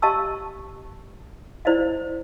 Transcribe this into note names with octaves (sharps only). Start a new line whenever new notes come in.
G4 D#5 F5 A5 C#6 E6
E4 C5 D5 D#5 F5